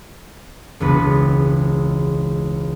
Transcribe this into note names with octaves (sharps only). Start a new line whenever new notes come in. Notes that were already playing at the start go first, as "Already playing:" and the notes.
E1 C#2 B3 B4